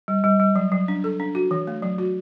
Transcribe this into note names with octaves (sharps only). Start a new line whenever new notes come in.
G3
G3
G3
F#3
F#3
D4
A4
D4
F#4
E3
A3
F#3
F#4